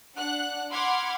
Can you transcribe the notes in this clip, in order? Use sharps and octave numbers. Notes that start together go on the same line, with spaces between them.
D4 F#5 F#6
F#5 B5 C6 D6 F6 G#6